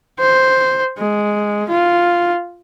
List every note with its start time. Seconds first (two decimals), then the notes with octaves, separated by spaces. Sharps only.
0.19 C5
0.98 G#3
1.69 F4